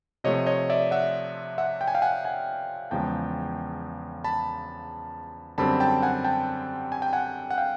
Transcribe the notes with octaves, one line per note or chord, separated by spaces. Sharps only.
C3 F3 A3 C#5 D#5
C#5 D#5
D5 E5
E5 F#5
E5 F#5
G5
G#5
F5 G5
F#5 G#5
F#5 G#5
E2 C#3 F3 G#3 G5 A5
A5 B5
F#2 D3 G3 C4 A5 B5
G5 A5
F#5 G#5
G5 A5
G#5
G5
F#5 G#5
F#5
F5 G5